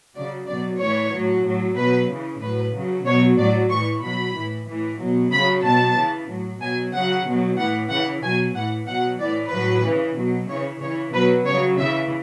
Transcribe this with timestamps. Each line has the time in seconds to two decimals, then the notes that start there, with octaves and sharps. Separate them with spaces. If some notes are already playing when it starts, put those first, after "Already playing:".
0.15 C#3 F#3 D5
0.48 B2 F#3 D5
0.80 A2 E3 C#5
1.12 A2 F#3
1.44 A2 F#3
1.76 B2 F#3 B4
2.09 C#3 E3
2.41 A2 F#3 B4
2.74 C#3 F#3
3.06 B2 F#3 C#5
3.38 A2 F#3 D5
3.71 A2 E3 C#6
4.03 B2 F#3 B5
4.35 A2 E3
4.67 A2 E3
4.99 B2 F#3
5.32 C#3 F#3 B5
5.64 B2 F#3 A5
5.97 C#3 E3
6.29 A2 F#3
6.61 B2 F#3 G#5
6.93 C#3 F#3 F#5
7.26 B2 F#3
7.58 A2 E3 F#5
7.90 C#3 E3 F#5
8.23 B2 F#3 G#5
8.55 A2 E3 F#5
8.88 B2 F#3 F#5
9.20 A2 E3 D5
9.52 A2 F#3 B4
9.84 C#3 E3
10.17 B2 F#3
10.49 C#3 E3 C#5
10.81 C#3 E3 C#5
11.13 B2 F#3 B4
11.46 C#3 F#3 C#5
11.78 C#3 E3 E5